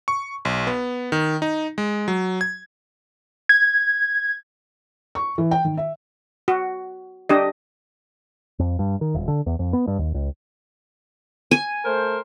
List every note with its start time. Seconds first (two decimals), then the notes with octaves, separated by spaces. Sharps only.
0.08 C#6
0.45 B1
0.67 B3
1.12 D#3
1.42 D#4
1.78 G#3
2.08 F#3
2.41 G#6
3.49 G#6
5.15 C#6
5.38 E3
5.51 G5
5.65 D#3
5.77 E5
6.48 F#4
7.29 D4 G4 D#5
8.59 F2
8.79 G2
9.01 D#3
9.14 D#1
9.28 D3
9.46 E2
9.59 F2
9.73 B3
9.87 G2
9.99 D#2
10.14 C#2
11.51 G#5
11.85 A3 A#4 C5